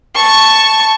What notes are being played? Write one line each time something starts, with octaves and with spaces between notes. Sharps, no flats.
A5 C#6